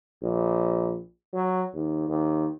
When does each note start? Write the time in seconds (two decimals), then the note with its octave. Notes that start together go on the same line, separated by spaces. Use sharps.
0.23 A#1
1.34 F#3
1.74 D#2
2.08 D#2